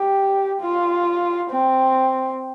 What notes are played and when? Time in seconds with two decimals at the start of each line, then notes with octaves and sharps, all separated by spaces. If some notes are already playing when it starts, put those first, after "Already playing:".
Already playing: G4
0.61 F4
1.50 C4